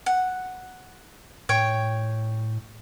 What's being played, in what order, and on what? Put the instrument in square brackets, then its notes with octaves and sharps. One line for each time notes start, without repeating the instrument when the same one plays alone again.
[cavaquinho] F#5
[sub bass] A2 [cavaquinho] C#5 G5